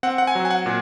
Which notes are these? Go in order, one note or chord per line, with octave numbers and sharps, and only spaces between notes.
C4 F#5
F#5
G#5
F#3
G#5
F#5
A#2